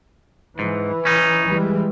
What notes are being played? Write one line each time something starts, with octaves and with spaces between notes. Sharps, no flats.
G#2 E3
C#4 D#4
E3 G3 G#3